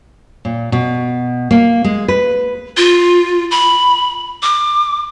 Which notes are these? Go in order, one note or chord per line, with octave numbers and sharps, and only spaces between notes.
A#2
B2
A#3
G#3
B4
F4
B5
D6